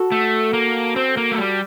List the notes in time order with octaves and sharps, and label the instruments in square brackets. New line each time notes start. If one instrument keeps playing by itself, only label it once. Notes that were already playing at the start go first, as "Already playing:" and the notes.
Already playing: [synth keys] F#4 A4
[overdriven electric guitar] A3
A#3
C4
A#3
A3
G3